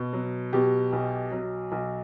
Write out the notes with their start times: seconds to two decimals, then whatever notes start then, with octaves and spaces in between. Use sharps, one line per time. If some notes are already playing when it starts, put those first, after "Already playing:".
Already playing: B2
0.13 F#3
0.53 B2 G4
0.93 B1
1.32 F#3
1.72 B1